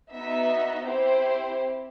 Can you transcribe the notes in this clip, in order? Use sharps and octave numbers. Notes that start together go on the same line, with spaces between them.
B3 D#4 F#4 E5
C4 E4 G4 C5